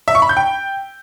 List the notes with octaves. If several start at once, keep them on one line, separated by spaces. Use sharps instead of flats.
E5
C#6
B5
G6
G5